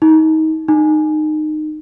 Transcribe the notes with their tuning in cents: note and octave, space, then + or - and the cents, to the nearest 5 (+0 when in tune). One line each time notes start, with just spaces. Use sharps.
D#4 +25
D#4 -20